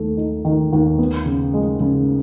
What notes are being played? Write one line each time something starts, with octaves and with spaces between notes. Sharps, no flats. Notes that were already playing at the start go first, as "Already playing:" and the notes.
Already playing: D#2 A3
D#4
D#3
D#2
B3
C#3
G#3
C#3